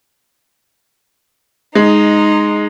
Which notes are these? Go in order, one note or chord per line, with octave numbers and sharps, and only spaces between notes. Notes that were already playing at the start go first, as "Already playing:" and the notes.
G#3 D#4